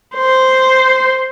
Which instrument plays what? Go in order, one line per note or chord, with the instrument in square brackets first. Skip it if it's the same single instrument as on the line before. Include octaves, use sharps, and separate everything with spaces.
[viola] C5